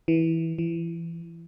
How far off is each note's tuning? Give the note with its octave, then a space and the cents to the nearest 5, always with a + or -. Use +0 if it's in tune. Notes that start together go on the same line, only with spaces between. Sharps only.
E3 -15
E3 +25